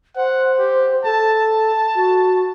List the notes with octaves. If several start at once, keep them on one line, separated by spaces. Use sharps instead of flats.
C5 F#5
G4
A4 A5
F#4